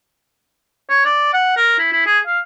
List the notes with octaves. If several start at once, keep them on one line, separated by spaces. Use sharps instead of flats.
C#5
D5
F#5
A#4
E4
E4
G#4
F5